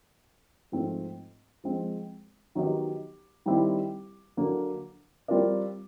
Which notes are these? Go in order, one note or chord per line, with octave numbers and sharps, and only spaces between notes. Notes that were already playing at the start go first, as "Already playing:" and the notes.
G#2 F3 A3 C4 F4
F3 G#3 C4
D#3 F#3 B3 D#4 G4
D#3 G3 C4 E4 G4
D3 F#3 A#3
G3 C4 F4 A#4 D5